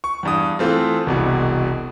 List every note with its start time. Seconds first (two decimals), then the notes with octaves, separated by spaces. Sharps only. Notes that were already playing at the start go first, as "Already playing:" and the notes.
0.04 C#6
0.23 E2 G2 D#6
0.59 E3 A3 C4 F4
1.06 E1 C2 B2